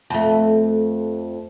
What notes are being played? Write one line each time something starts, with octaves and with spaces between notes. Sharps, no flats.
F2 A3